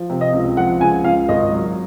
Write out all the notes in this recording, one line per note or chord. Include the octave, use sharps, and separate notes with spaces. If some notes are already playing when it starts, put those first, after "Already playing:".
Already playing: F3
C3
D#5
C#2
F3 F#5
C#2 G#5
C#2 F5
G#1 D#5
F#3